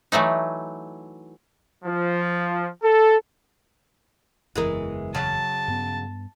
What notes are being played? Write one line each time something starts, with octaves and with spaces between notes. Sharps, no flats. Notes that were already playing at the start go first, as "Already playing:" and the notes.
E3 F#3 A3 D#4
F3
A4
F#1 E2 E3 G#3 A#4
F#2 C#3 F#3 A5
G2 B3